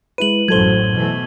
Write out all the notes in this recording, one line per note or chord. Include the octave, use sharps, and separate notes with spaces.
G#3 E4 B4 D#7 F#7
A1 F#2 A2 F#3 A4 C5 G#6 G7
B2 E3 A3